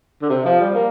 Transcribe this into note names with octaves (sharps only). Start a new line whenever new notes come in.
D3
C3
F3
G3
A#3